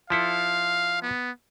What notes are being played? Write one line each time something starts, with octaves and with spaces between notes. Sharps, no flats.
F3 E4 A4 F5
B3